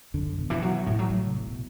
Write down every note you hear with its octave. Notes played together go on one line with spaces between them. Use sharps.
F#2 D3
F#2
B2
B2 E3
F#3
E3
A2 E3
F#3
F#3
C3
B2
B2